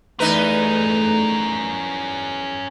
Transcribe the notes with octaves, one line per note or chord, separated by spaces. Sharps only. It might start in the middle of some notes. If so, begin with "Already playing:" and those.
E2 A3 C#4 D#4 A#4 B4